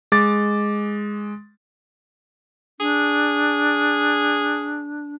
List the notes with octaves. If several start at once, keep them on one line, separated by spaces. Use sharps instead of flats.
G#3 D6 A6
D4 G#4